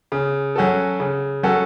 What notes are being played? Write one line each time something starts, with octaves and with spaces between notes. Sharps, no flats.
C#3
F#3 C#4 F#4 A4
C#3
F#3 C#4 F#4 A4